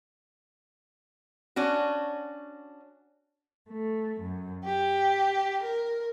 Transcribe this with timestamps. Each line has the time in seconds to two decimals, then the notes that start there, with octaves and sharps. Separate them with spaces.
1.56 C#4 D4 F#4
3.69 A3
4.20 F#2
4.65 G4
5.63 A#4